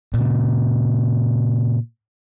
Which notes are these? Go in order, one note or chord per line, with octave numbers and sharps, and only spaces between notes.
A#2 C#3